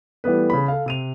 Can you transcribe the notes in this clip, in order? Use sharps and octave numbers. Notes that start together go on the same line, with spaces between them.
E3 G3 A3 B3 B4
C#3 B5
A4 F5
C3 D#7 F7